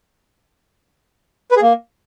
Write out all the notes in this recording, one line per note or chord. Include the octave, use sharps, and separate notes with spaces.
B4
G#4
A#3